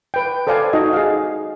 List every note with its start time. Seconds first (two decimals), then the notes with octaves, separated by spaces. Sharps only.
0.14 B4 G5
0.47 A4 C5 D5 F5 G#5
0.73 D#4 F#4 D#5
0.93 G#4 F5